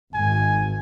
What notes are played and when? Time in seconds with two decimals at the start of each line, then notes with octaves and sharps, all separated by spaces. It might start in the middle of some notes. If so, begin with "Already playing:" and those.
0.14 G#1 G#5